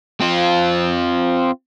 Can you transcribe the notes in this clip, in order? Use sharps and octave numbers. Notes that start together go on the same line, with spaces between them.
C4 F4